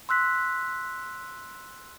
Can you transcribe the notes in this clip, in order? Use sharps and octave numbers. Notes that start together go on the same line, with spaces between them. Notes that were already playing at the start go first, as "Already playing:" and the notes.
C6 E6 F#6 B6